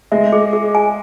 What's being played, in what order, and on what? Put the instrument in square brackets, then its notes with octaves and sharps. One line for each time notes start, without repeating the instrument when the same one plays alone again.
[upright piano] G#3 [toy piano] E5
[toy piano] G#4
G#4
G#5